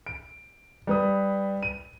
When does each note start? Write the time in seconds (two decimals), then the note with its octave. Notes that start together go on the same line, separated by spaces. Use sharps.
0.06 D7
0.87 G3 B4 D#6
1.63 D#7